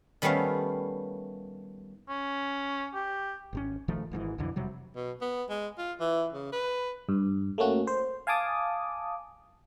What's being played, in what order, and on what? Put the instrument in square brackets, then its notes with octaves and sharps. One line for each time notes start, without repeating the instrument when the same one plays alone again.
[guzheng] D#3 G3 A3 B3 C#4 F5
[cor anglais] C#4
G4
[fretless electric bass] G#1 B2 C#4
A#1 D#3 F3 A3
G#1 G#2 D#3 E3
B1 F2 D3 E3
E1 C3 F#3 G3
[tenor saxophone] B2
B3
G#3
F4
E3
C#3
B4
[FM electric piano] G2
A3 A#3 C#4 F#4
C5
F5 G#5 A5 D6 D#6